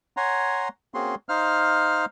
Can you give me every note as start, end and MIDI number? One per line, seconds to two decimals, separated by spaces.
0.17 0.69 73
0.17 0.69 78
0.17 0.69 80
0.17 0.69 82
0.17 0.69 84
0.94 1.15 58
0.94 1.15 60
0.94 1.15 61
0.94 1.15 66
0.94 1.15 68
0.94 1.15 84
1.29 2.06 63
1.29 2.06 72
1.29 2.06 77
1.29 2.06 89